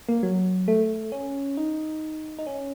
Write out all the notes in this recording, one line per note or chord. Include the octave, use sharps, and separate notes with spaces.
A#3
F#3
A3
C#4
D#4
D#4
C#4